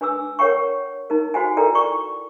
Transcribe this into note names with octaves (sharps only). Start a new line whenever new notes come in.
D4 B4 G#5 D6 E6
A#4 C#5 F#5 G5 C#6
D#4 A#4
F#4 C5 F#5 G#5
E4 A4 A#4 D5 G5
G5 C#6 D6